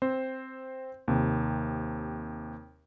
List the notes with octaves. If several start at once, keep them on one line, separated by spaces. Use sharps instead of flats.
C4 C5
D#2 C3